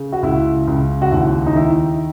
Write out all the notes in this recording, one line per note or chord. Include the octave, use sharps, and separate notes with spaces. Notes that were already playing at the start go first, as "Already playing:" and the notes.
Already playing: C#3
F#4
C#2 E4
C#2
F#4
D#2 E4
D#4
D#3 E4